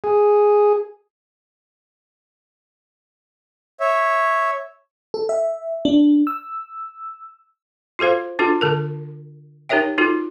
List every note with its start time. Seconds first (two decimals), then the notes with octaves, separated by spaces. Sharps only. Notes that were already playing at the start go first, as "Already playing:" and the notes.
0.04 G#4
3.80 C#5 E5
5.14 A4
5.29 E5
5.85 D4
6.27 E6
7.99 F4 F#4 A4 C5 F5
8.39 D4 F4 F#4 A4
8.61 D3 A4 A#4
9.69 D#4 G4 A#4 C#5 E5 G5
9.98 D#4 F4 F#4 A4